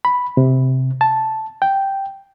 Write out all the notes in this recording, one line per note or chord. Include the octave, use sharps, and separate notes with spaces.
B5
C3
A5
G5